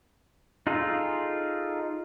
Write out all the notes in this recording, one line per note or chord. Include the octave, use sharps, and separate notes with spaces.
D#4 F4 G#4 A4